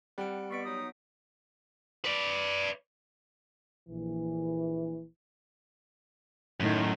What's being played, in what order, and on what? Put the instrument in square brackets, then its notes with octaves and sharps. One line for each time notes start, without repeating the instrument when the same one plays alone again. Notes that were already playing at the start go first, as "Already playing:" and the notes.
[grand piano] G3 [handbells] C4 F#5 D7
[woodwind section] B2 D5 C#6 [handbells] B3 B6 D7
[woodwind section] F#3 D#4 D#6
[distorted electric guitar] B4 D5
[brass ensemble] A#1 E3
[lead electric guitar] F#2 [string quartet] A2 D#3